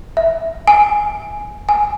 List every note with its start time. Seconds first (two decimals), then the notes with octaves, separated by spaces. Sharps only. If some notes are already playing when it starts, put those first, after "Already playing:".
0.17 E5
0.68 G#5
1.69 G#5